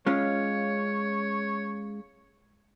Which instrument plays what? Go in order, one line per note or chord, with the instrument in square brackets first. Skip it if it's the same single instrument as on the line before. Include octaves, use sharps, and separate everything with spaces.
[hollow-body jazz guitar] G#3 C#4 F4 [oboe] C#5